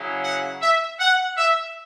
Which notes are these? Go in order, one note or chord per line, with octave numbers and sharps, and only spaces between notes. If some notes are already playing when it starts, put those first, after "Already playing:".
Already playing: C#3 F#3 C#4 E4
F#5
E5
F#5
E5